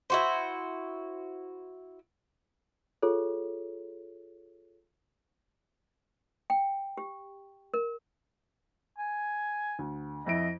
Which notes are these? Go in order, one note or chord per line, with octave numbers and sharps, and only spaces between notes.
E4 F#4 C5
F4 G#4 A4 C#5
G5
G4
A#4
G#5
D2
F2 E4 D#5 D7